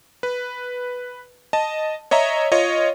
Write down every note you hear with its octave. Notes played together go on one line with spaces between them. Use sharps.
B4
D#5 A5
C#5 D#5 E5 A#5
F4 C#5 D#5